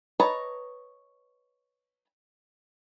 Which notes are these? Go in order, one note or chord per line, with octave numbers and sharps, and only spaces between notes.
B4 C#5 D#5 A5 A#5